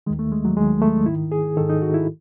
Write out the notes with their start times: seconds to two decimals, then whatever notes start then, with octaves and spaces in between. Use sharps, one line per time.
0.06 D#3 G#3
0.10 D#2
0.19 A3
0.32 G#3
0.45 F#3
0.57 D#2 G#3
0.60 D#3
0.82 A3
1.06 G#2 D#3 E4
1.32 G#4
1.57 D#3 A4
1.60 G#2
1.69 D#4
1.82 F#4
1.94 E4